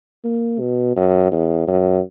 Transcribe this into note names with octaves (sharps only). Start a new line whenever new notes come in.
A#3
B2
F#2
E2
F#2